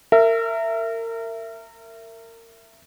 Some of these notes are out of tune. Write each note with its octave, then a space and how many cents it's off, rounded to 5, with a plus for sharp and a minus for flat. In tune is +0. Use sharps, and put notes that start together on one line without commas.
A#4 -30 E5 +15